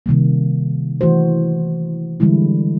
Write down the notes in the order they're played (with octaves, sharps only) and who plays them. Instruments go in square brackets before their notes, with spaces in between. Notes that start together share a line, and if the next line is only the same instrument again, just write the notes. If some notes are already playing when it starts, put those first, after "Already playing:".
[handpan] C3 D#3 G3 A#3
E3 A3 F#4 C5
D3 E3 G3 G#3 E4